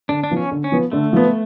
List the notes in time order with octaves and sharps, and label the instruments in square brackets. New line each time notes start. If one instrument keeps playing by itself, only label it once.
[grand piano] D3 [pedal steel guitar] D4
[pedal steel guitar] D4
[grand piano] F3 B3
[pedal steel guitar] C#4
[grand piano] D3
[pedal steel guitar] C#4
[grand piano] F3 B3
[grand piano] D3 [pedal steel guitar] A3
[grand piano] F3 B3